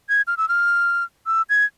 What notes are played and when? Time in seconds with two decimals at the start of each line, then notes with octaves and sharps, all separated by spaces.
0.09 G#6
0.27 F6
0.37 E6
0.49 F6
1.27 E6
1.50 G#6